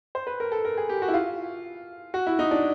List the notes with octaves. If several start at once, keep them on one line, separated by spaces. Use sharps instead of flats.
C5
B4
A#4
A4
A#4
G#4
G4
F#4
E4
F4
F#4
E4
D#4
D4